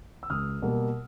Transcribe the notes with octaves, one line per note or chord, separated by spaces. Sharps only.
E6
C#2 D#6 F6
B2 G3 A#3